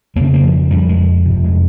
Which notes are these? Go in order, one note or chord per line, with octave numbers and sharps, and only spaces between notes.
F2 C#3 A#3 C4
A#3
F3
F2 C#3 G3
G#3
F2 C3
G#3